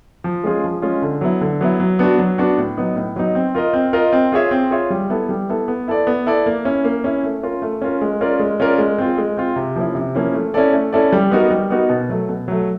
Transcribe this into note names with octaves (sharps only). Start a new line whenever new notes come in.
F3
G#3 C#4 F4 G#4
F3
G#3 C#4 F4 G#4
D3
F#3 B3 E4
D3
F#3 B3 E4
F#3
B3 D4 F#4
F#3
B3 D4 F#4
A2
F#3 B3 D#4
A2
F#3 B3 D#4
C4
F4 A#4 D#5
C4
F4 A#4 D#5
C4
F4 G#4 C#5 E5
C4
F4 G#4 C#5 E5
G3
B3 E4 A4
G3
B3 E4 A4
B3
E4 A4 D5
B3
E4 A4 D5
A#3
C#4 E4
A#3
C#4 E4
A3
C#4 F4 A#4
A3
C#4 F4 A#4
G#3
C#4 F4 A#4 D5
G#3
C#4 F4 A#4 D5
G#3
C4 F4
G#3
C4 F4
C3
F3 A#3 C#4 E4
C3
F3 A#3 C#4 E4
A3
C#4 E4 A4 D5
A3
C#4 E4 A4 D5
G3
B3 D#4 F#4 A#4
G3
B3 D#4 F#4 A#4
B2
F#3 A3
B2
F#3 A3